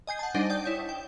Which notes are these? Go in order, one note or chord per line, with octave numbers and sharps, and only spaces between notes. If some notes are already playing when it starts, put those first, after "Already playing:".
D#5 G#5 G6 C7
F#5 A5
G3 D4 D#4 C5 D#5 F#5
D5 G5 D#6 G6
E4 C#5
G5